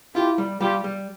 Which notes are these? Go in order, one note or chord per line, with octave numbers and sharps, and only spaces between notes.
E4 F4 G4
G3
G3 F4 G4
G3